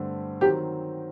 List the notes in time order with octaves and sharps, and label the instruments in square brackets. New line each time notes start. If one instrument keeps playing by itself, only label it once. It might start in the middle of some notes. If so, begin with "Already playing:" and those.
Already playing: [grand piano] G2 D3 A3 C4
[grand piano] D#3 F#3 C4 [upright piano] G4